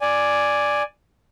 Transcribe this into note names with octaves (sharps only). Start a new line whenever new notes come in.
D5 G#5